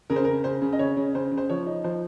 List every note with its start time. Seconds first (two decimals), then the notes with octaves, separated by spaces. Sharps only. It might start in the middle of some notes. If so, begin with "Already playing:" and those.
0.10 C#3 A#4
0.16 C5
0.24 A#4
0.27 C#3
0.44 C#3 C5
0.62 C#3
0.73 D#5
0.79 C#3 C#5
0.97 C#3
1.15 C#3 C5
1.32 C#3
1.38 C5
1.49 F3 C#5
1.66 D#4
1.84 F3 C5